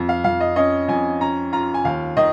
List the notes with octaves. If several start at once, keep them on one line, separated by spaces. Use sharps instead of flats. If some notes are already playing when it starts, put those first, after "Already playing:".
Already playing: F2
F5
F2 F5
D#5
C#4 D#5
F2 G#5
C#4 A#5
F4 A#5
G#5
D#2 F5
D#3 D#5